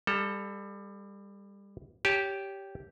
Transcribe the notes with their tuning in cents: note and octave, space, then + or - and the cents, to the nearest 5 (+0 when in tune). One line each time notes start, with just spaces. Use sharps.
G3 +25 A4 +0 A#5 +0
G4 -5 C#5 +20 A5 -40